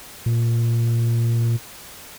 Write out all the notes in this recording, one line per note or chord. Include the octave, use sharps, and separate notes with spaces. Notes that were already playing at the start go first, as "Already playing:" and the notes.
A#2